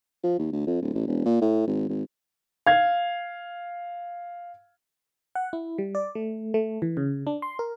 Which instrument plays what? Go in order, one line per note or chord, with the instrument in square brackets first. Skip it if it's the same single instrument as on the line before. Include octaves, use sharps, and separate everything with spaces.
[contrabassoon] F3
D#2
D2
F2
D1
A1
E1
A#2
A2
G#1
G#1
[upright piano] F5 G#6
[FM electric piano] F#5
E4
G3
D5
A3
A3
E3
C#3
D4
C6
A#4